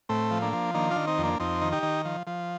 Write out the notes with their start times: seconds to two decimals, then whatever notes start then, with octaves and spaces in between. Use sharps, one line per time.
0.09 A2 A3 C4
0.31 F3
0.42 A#3 D4
0.53 F3
0.74 D#3 A#3 D4
0.91 D4 F4
0.96 D#3
1.07 C4 D#4
1.18 F2
1.23 A#3 D4
1.40 F2 C4 D#4
1.62 D#3
1.72 D#4 G4
1.83 D#3
2.05 F3
2.27 F3